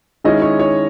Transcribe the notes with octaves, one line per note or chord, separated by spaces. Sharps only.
D#3 G#3 C#4 E4 D#5
C#5
C#5